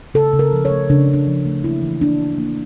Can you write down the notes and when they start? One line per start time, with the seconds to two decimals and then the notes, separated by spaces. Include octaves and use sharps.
0.14 C#3 A4
0.33 C#3
0.39 A#4
0.53 F3
0.65 C#5
0.70 A3
0.90 C#3 D4
1.08 C#3
1.14 D4
1.27 F3
1.45 A3
1.64 A#3 E4
1.82 E3
2.01 A#3 D4
2.20 E3
2.38 A#3